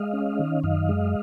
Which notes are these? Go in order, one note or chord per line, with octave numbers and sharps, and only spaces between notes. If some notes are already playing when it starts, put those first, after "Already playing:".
Already playing: G#3 D#5 F5
C#4
D#3
F#2 D#5 F5
G#3